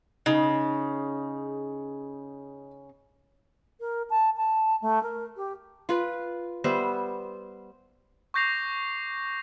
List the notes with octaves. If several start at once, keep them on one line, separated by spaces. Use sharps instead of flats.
C#3 D#4
A#4
A5
A5
A3
A#4
G4
F4 B4
G3 B3 C5 E5
C#6 D6 G6 A#6 C7 F7